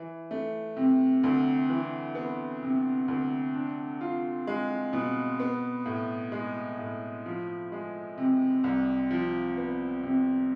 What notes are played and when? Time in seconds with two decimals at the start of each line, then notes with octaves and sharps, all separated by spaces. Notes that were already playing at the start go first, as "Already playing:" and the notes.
Already playing: E3
0.31 A3
0.77 C3
1.24 D2
1.70 E3
2.15 B3
2.63 C3
3.08 D2
3.54 D4
4.01 F4
4.47 G#3
4.93 B2
5.40 B3
5.86 A2
6.32 G#3
6.79 A2
7.26 F3
7.72 G#3
8.18 C3
8.64 C2
9.11 F3
9.57 B3
10.03 C3